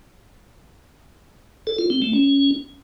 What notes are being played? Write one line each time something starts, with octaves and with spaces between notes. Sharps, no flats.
A4
F4
C4
A3
C#4